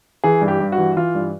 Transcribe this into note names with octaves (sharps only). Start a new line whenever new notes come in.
E3 G#4
G2
G4
G2
F#4
E3
E3 F4
G2